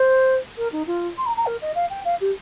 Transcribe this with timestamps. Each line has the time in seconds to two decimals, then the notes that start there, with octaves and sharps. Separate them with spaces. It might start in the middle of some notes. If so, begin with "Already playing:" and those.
Already playing: C5
0.58 A#4
0.72 D#4
0.87 F4
1.18 C6
1.26 A#5
1.37 A#5
1.46 A#4
1.62 D#5
1.75 F5
1.90 G5
2.05 F5
2.21 G4